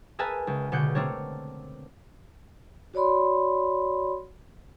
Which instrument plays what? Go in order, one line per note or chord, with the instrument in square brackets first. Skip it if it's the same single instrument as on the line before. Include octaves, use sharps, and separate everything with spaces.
[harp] G#4 A#4 B4 E5 G#5 A5
C#2
C#2 B2 D3 F#5 G6 C#7
A3 C4 D4 A#4 C#5
[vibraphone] F#4 C#5 D5 B5 C6